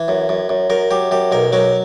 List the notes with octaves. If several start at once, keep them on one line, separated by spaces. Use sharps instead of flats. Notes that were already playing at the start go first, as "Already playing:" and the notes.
Already playing: E3
F#2
F#2
F#2
F#2 A#4
F#2 G4
F#2 G4
B1 A#4
F#3 A#4